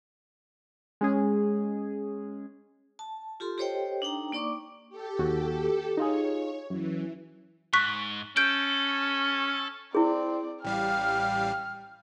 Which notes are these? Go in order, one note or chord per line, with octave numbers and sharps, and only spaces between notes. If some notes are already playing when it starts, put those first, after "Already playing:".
G#3 C#4 G#4
A5
F4 G4 A4 C6
G4 A4 C5 C#5 D#5 G5
D4 D#4 G5 A#5
A#3 D#4 D5 C#6 D6
G4 A4
D#2 F#4
D#4 F4 G#4 C#5
F#2 E3
G#2 C#6 F#6 B6
C#4 A4 G6 D7
C4 E4 G#4 D5
A1 G3 F5 G5 F6